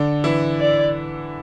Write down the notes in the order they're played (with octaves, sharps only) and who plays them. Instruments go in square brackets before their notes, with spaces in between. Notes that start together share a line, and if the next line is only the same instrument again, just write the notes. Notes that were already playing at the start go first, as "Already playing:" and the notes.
Already playing: [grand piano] D3 D4
E3 E4
[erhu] D5